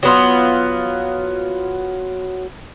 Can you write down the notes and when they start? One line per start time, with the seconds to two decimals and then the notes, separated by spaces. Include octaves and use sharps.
0.03 F#3 B3 F4